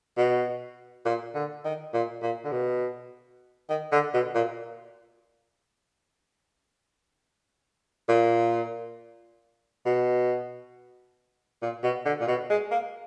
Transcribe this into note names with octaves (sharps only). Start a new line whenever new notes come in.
B2
A#2
D3
D#3
A#2
A#2
D3
B2
D#3
D3
B2
A#2
A#2
B2
A#2
B2
D3
A#2
B2
G#3
A#3